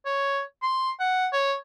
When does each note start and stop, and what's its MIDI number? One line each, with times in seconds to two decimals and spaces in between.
0.05 0.41 73
0.62 0.91 84
1.00 1.27 78
1.32 1.54 73